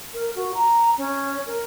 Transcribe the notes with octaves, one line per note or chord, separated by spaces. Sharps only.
A#4
F#4
A#5
C#4
A#4